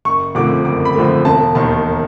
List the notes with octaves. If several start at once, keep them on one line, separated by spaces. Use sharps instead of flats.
F#1 C#6
F2 D3 F3 A3 D6
F#1 D6
B5
F2 D3 F3 A3
E1 A5
D#2 D#3 A5